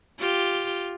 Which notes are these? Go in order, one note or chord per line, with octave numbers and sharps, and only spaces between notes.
F4 G4